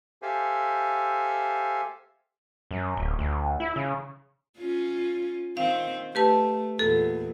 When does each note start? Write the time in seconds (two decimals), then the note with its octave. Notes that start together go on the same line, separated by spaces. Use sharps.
0.22 G4 A4 C5 E5 F5 G#5
2.71 F#2
2.97 D1
3.19 D2
3.60 E4
3.76 C#3
4.58 C#4 F4
5.57 D#3 C4 F5
6.15 A3 G4 B4 A5
6.79 E2 A#2 A4